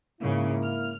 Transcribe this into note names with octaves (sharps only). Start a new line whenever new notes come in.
G#2 C#3 A#3 E4
F6